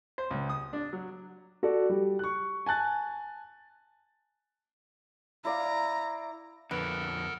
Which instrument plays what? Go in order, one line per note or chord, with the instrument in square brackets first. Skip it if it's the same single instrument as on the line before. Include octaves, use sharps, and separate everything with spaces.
[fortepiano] C5
C#2
D#6
D4
F#3
[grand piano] F#4 A4 D5
G3
C#6 F#6
G#5 A5 F#6 A6
[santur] E4 D5 F5 [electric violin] A#5
[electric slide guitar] F2 D3 [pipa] B3 [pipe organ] A4 A#4